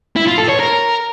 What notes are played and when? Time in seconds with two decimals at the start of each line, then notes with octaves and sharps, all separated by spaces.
0.16 E4
0.27 F4
0.38 A4
0.49 C#5
0.60 A#4